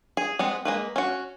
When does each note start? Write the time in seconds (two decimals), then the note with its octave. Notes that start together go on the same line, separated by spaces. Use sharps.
0.17 G#4
0.39 G#3 B3 C4
0.65 G#3 A#3 B4
0.96 C#4 F#4